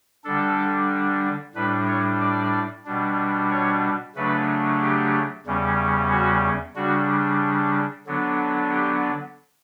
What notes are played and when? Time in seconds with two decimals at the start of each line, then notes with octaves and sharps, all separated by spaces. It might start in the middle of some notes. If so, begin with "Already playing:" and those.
0.24 D3 G3 D4 A4
1.55 A2 G3 D4 B4
1.88 C#5
2.20 D5
2.85 B2 G3 D4
3.51 C#5
4.15 C#3 F#3 A3 D4 B4
4.80 G4
5.46 E2 C#3 G3 C#4
6.11 F#4
6.76 C#3 G3 D4 F#4
8.07 D3 F#3 B3 D4
8.71 G4